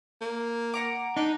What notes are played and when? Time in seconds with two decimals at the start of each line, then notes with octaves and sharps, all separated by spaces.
0.21 A#3
0.74 F#5 A#5 D6
1.17 D4 D#4